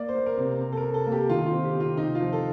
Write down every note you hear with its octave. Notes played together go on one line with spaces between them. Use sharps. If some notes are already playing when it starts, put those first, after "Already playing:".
Already playing: A#3 D5
C5
A#3
A#4
C3
C3
A4
A#4
C3
A4
A#3
G4
D#3 F4
F4
C4
G4
C3
F4
C3 D#4
F4
F3
A4